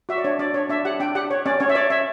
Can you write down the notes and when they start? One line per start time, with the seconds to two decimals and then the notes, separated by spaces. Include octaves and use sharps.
0.09 F#4 E5
0.18 D5
0.24 D4 C#5
0.39 D4 D5
0.54 D4 C#5
0.69 D4 E5
0.85 G4 F#5
1.00 D4 G5
1.15 G4 F#5
1.31 C#5
1.46 C#4 D5
1.60 C#4 C#5
1.69 E5
1.75 C#5 D5
1.90 C#5 E5